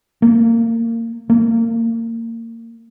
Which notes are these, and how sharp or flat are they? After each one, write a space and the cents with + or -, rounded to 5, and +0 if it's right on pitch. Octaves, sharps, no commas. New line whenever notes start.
A#3 -25
A#3 -30